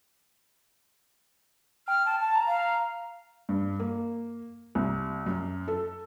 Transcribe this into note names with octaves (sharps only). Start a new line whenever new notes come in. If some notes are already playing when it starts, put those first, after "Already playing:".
G5 F6
A5
A5
A#5
F5
G2
A#3
C2
F#2
A4